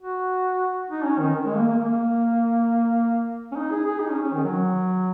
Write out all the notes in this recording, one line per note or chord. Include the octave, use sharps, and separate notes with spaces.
F#4
D#4
C#4
D#3
G#3
A#3
A#3
A#3
C#4
D#4
G#4
G#4
D#4
C#4
C#4
D#3
F#3